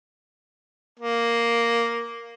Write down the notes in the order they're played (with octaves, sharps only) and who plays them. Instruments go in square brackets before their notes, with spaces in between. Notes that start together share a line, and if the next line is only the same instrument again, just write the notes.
[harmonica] A#3